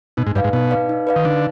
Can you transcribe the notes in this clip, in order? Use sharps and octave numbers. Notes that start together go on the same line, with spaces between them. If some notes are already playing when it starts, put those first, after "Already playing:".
B2 D#4
G#2
G2 B4 D5 F5
G#2
B2 D#4
B4 D5 F5
D#4
B4 D5 F5
D#3
D3 D#4